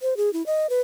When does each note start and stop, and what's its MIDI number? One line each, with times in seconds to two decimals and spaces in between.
0.01 0.17 72
0.17 0.32 68
0.33 0.45 64
0.46 0.67 75
0.70 0.81 71